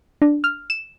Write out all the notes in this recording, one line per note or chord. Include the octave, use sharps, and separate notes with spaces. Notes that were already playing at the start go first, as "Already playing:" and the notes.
D4
F6
E7